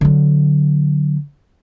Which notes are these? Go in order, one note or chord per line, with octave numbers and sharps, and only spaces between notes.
D3 F#3